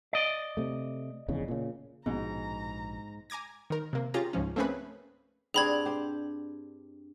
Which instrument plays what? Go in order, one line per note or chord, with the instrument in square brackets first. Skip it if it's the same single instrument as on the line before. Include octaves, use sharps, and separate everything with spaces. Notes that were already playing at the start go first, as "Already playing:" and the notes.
[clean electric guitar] D5 D#5
[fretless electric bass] C3 A3
F1 E2 C#3
A#2 C#3
[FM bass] A#1 [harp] G#2 [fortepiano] B2 [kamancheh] A#5
[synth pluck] G#5 A#5 D6 G#6 A#6
D#3 A#4
C3 A#3
C#4 F4 G4 G#4 A#5 A6
C#2 G#2 F3 C#4
A3 A#3 C4 C#4 G#4 B4
[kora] G2 C4 D4 [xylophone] G#4 B5 G#6
[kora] G4 C5